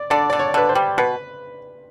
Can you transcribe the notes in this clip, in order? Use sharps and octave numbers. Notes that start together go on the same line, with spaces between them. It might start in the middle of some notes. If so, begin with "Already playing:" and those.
Already playing: D5
D3 D5
D3 D5
C#5
D3 B4
C5
G3
B2 B4